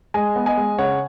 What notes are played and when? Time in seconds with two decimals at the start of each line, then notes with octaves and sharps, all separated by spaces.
0.14 G#3 D#5 G#5
0.36 B3
0.46 D#5 G#5
0.57 G#3
0.78 C#3 C#5 F#5